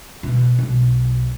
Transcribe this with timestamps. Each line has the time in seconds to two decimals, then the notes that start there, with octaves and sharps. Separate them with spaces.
0.23 B2
0.59 B1